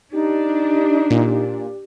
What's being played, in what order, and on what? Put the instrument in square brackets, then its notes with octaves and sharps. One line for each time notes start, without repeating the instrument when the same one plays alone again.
[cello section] D4 [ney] D#4 [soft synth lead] G4
[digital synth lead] A#2